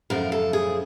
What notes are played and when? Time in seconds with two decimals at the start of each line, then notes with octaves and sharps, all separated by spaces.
0.10 F#2 C#3 F3 A3 A#4
0.32 A4
0.53 G#4